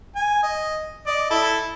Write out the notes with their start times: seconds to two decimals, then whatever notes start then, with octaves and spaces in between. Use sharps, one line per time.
0.15 G#5
0.43 D#5
1.07 D5 D#5
1.31 E4 A4